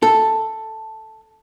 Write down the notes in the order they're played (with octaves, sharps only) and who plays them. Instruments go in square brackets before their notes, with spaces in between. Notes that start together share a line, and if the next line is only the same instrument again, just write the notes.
[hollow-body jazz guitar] A4